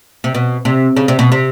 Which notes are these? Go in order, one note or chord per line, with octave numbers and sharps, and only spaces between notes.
C3
B2
C3
C#3
C3
B2
C3